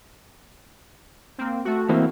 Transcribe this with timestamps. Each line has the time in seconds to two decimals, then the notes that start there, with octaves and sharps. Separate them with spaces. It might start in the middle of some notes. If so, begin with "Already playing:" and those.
1.38 A#3 C4
1.65 A3 F#4
1.89 E3 A#3 C4